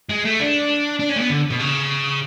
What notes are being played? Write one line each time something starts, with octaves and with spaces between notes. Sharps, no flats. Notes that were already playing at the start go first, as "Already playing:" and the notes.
G#3
A3
D4
D4
C#4
A3
B3
D3
B2
C#3